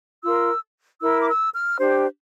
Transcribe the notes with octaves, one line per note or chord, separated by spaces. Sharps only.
F4 A#4 E6
E4 A#4 E6
D6
E6
F6
D4 G4 C5